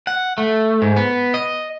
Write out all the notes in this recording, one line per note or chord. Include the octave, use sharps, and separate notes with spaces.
F#5
A3
G#2
B3
D#5